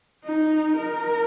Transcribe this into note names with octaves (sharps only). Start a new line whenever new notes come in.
D#4
A#4